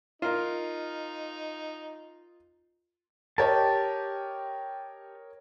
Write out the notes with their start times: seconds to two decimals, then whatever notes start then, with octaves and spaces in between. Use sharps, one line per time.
0.22 D#4 F4 A#4
3.38 G4 A#4 C#5 D#5 A5